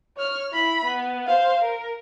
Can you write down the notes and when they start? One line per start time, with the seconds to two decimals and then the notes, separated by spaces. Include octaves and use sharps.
0.17 C#5 F6
0.53 E4 B5
0.84 B3
1.27 C5 F5
1.61 A#4